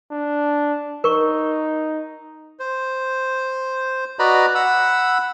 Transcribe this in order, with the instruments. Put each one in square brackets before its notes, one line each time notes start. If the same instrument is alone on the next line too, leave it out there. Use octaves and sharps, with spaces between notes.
[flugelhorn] D4
[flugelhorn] D#4 [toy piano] A#4 C#6
[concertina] C5
F#4 B4 D5 D#5 A#5 B5
F#5 B5 E6